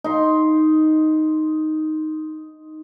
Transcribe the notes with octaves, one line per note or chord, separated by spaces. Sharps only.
D#4 C6